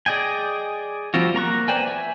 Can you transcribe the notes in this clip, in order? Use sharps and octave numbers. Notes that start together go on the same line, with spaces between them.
G#4 D5 D#5 G5 G#5
F3 G3 C4 F4 F#4
A#3 A#5 C#6 F#6
B4 C5 D5 G5 G#5
E5 G#5